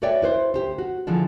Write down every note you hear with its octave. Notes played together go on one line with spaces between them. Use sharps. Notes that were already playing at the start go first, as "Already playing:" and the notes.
F#4 B4 C#5 D5 E5 G5
E4 B4 C5
D2 G#2 G4 C5
F#4
D3 E3 F3 G#3 D4